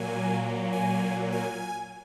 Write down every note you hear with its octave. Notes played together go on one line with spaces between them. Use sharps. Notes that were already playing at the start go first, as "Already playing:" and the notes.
Already playing: A#2 F#3 A#3 G#5
G#5
G#5